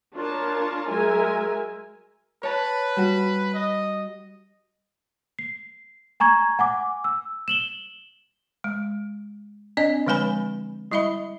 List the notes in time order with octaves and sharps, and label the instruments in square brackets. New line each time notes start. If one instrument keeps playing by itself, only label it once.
[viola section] D4 F4 A#4 C#5 A5
F#3 G#3 A#4 E5 G#5
[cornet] B4 [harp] C#5 A5
[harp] G3 F#4
[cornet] D#5
[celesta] C7
G#5 A#5 C#6 G#6
F#5 G#5 D6
E6
E7 F#7 G7
[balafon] G#3
C4 D4 D5 D#5
D3 F3 G#3 B4 G#5 B5
G3 E4 D#5 E5 B5